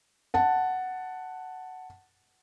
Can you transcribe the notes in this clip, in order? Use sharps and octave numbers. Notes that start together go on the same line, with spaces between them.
F#5 A5